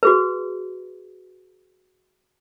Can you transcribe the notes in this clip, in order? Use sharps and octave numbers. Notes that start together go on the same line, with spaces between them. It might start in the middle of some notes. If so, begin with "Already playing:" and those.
F#4 G#4 B4